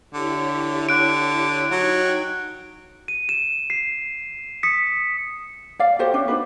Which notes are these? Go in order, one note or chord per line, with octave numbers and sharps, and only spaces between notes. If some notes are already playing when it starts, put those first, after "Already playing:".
D3 E4 G4 C#5
D3 F#6 D7
F#3 D#4 G5 G#6
D#7
E7
C7
D#6 B6 C#7
D5 F5
F#4 G4 A4 C5
C#4 D4 E5
D4 D#4 F#4 B4